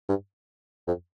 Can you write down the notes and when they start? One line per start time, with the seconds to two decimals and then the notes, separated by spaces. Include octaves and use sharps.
0.09 G2
0.87 F2